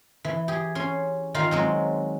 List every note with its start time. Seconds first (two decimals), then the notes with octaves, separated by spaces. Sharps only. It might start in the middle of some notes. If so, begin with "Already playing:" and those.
0.25 E3
0.48 G4 G#4
0.75 C#4 C6
1.34 D#3 F4 F5
1.51 F#3 G#3 C4